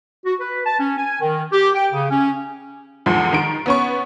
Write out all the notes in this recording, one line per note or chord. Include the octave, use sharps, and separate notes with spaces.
F#4
B4
A5
C#4
G#5
D#3
G4
G5
C#3
C#4
E2 G#2 D3 F3
D#3 D7
B3 C#4 C#6